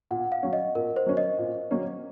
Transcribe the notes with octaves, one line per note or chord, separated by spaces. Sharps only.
A#2 F#5
F5
F#3 C#4
D#5
A#2 A#4
C5
F#3 C#4
D#5
A#2
F#3 A#3 C#4